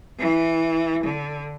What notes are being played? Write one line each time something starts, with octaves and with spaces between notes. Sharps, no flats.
E3
D3